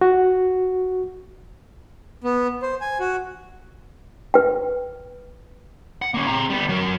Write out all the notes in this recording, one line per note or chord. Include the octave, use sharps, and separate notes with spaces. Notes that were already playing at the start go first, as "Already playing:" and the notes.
F#4
B3
C5
G#5
F#4
B4 G5
F#5
A#3 C#4
C4 A#5
G3 B3
F#3 A#4